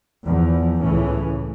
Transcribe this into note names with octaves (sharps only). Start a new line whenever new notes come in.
E2 F3
C#2 A2 E3 C#4